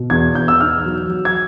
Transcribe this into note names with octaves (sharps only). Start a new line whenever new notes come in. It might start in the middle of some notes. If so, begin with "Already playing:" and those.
Already playing: B2
E2 G#6
E2 G6
E6
D#4 F6
F#3
F#3
G#6